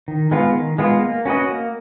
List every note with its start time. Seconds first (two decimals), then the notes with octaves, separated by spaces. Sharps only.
0.08 D#3
0.31 G#3 B3 F4
0.55 D#3
0.78 G#3 B3 F4
1.02 A#3
1.25 C#4 F#4 B4 D#5
1.49 A#3